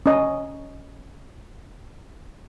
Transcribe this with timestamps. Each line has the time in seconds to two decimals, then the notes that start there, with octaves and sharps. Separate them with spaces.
0.06 C#4 D#5